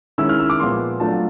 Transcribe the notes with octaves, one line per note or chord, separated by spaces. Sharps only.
D#3 G#3 C#4 E4 E6
F6
E6
D6
A#2 F3 G#3 B3 C6
F#3 A3 D4 F4 A5